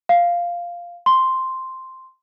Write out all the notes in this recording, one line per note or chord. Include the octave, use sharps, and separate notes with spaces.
F5
C6